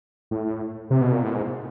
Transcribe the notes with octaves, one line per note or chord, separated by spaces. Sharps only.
A2
C3
B2
A#2
A2
G#2